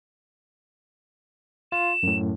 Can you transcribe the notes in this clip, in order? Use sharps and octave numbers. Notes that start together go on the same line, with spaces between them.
F4 E7
F#2 A2